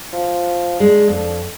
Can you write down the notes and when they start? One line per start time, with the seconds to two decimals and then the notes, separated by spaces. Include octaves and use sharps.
0.13 F3
0.80 G#3 D4
1.08 F2